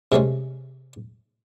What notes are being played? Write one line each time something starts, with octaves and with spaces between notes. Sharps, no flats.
C3 G#3 A3 C#4